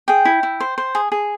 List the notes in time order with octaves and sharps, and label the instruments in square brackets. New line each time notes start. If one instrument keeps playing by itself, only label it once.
[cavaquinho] G#4 G5
E4
E4
C5
C5
G#4
G#4